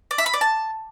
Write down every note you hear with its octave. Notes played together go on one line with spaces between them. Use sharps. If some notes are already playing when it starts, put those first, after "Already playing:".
D5
E5
B5
D5
A5